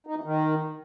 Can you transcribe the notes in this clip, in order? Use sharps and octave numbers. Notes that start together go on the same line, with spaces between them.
D#4
E3
D#3